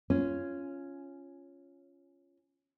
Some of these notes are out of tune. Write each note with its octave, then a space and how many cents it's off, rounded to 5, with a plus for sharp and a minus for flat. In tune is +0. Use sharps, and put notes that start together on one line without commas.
C#4 +0 F4 -15